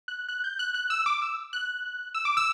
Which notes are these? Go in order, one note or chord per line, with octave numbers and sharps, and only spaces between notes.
F#6
F#6
G6
F#6
F#6
E6
D6
E6
F#6
E6
D6
E6